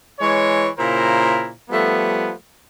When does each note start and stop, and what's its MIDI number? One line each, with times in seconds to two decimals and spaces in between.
0.19 0.67 52
0.19 0.67 56
0.19 0.67 73
0.78 1.50 46
0.78 1.50 49
0.78 1.50 64
0.78 1.50 70
0.78 1.50 72
1.69 2.31 53
1.69 2.31 55
1.69 2.31 57
1.69 2.31 59